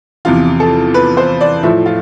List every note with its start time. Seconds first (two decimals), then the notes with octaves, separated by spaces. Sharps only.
0.25 E2 C3 F3 F4
0.60 A4
0.94 B4
1.17 C5
1.41 D5
1.63 A2 F3 E5
1.86 F4